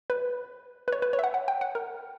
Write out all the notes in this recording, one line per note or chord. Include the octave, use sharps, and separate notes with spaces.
B4
B4
C#5
B4
C#5
E5
F#5
F#5
G5
F#5
A#4